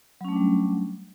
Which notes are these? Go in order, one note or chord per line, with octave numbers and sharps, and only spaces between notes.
F#3 G3 A3 C#4 D4